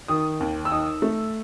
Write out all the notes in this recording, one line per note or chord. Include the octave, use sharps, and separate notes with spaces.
D#3 D#6
D#2
E6
D#4 D#6
A3